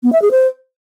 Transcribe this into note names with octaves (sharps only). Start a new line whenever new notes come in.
B3
E5
G#4
C5